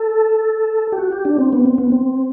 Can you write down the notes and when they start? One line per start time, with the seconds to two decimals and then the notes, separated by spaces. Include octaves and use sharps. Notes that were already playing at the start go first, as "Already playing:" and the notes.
Already playing: A4
0.92 G4
0.98 F#4
1.12 G4
1.25 D4
1.38 C4
1.53 B3
1.66 C4
1.78 B3
1.92 C4